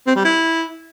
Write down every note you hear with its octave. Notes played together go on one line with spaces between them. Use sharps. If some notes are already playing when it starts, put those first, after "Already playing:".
C4
G3
E4